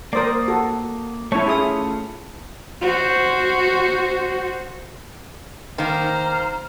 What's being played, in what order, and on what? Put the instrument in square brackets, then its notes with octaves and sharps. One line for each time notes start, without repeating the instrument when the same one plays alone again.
[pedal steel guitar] A#3 D#6 [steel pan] A#4 C5 D5
[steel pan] F#4 A4
[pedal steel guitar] A3 C#4 F4 [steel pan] E4 C#5
[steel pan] E4 G#4 D#6
[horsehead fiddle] F#4 C5
[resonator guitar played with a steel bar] D#3 A#3 [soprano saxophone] C5 [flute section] A#5 F6